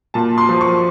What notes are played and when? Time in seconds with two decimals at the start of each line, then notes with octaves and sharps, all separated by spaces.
0.14 A#2 A5
0.38 C6
0.49 F3
0.61 C#6